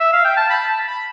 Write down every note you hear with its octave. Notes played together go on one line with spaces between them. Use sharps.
E5
F5
G5
A5
B5
A5
B5